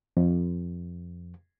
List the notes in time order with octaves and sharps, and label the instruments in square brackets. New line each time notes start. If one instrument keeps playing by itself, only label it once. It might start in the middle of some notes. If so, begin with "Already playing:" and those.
[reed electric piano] F2